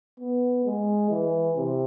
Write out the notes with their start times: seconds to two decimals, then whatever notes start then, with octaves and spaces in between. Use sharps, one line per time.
0.20 B3
0.65 G#3
1.10 E3
1.56 C3